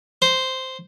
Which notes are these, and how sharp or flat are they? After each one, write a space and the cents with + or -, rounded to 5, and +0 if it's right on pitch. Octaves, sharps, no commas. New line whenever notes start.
C5 -5